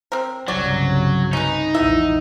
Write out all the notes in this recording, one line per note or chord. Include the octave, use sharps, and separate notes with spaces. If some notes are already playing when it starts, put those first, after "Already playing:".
C4 A#4 C5
G1 C2 C#3 F#3 D5
C#4 D#4 B4
A#1 E2 G#2 B3 E4 E5